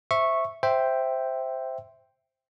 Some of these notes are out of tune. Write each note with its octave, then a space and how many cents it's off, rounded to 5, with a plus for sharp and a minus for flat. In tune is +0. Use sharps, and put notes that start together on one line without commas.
C5 +0 E5 +0 C#6 -10
C5 +0 E5 +0 G5 +0